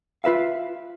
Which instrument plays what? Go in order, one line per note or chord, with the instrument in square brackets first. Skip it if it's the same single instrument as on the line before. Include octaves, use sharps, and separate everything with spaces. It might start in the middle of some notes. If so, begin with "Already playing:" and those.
[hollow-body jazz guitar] F4 B4 E5 F5